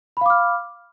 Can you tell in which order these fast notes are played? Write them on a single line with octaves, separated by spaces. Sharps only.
B5 F5 D6 F6